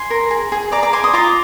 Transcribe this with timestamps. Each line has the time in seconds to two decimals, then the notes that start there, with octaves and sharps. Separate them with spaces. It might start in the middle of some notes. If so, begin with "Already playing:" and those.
Already playing: G#5 C6
0.10 A#4
0.31 G#4
0.52 G#4
0.72 D5 A#5 D6
0.83 A#5 D6
0.93 D5 G#5 C6
1.03 C6 D#6
1.13 F4 A#5 D6